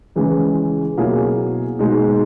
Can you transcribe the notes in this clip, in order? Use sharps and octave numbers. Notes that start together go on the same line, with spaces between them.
C#3 E3 G#3
B2 F#3 A#3 E4 G#4
B2 G#3 D#4